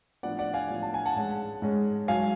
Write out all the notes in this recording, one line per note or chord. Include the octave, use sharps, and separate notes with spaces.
A2 F3 B3 D4 D5 F#5
D5 F#5
F5 G#5
A2 F3 B3 D4
A5
G#5
F#5 A5
G#2 G#3 C#4
G#2 G#3 C#4
G#2 F#3 C#4 F5 G#5